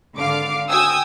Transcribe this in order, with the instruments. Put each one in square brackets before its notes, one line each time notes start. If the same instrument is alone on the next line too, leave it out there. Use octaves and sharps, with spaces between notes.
[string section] G#1 D3 F5 D6
F#4 G5 G#5 D#6 E6